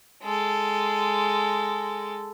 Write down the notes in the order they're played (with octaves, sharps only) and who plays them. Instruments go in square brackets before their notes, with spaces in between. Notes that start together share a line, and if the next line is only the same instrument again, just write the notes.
[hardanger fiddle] G#3 A4